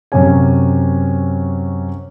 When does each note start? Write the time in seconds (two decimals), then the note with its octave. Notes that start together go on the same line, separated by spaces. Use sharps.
0.12 F#2 C3 C#4 G#5